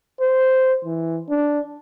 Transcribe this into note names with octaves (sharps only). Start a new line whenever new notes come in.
C5
E3
D4